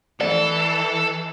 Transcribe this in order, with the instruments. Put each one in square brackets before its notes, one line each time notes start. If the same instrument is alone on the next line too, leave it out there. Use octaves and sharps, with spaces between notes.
[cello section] E3 [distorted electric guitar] A4 [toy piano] D5